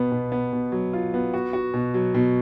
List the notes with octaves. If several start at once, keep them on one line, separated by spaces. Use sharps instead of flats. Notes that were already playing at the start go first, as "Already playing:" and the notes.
Already playing: B2 B3
B2
B3
B2
F#3
F4
B3
F#4
F#4
B2
F#3
B2